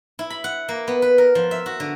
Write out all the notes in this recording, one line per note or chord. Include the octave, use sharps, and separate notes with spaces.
E4
B5
F#5
A#3
B3
B4
A#4
F3
E5
F#4
D3